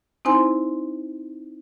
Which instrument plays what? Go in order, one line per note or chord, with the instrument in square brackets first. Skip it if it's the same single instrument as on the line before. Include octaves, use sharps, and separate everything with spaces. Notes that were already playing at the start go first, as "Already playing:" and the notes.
[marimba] C4 D#4 E4 C5 G#5 C6